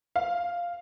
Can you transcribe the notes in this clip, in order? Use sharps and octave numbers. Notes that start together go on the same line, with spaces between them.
F5